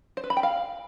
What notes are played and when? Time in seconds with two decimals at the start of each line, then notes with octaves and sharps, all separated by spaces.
0.17 C5
0.24 B4
0.30 B5
0.37 G5
0.43 F5